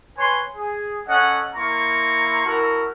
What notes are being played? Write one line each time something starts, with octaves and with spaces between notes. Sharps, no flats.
B4 C#5 G#5 C6
G#4
C#4 A4 D#5 F#5
A#3 E4 A#5 C6 C#6
E4 F#4 A4 A#4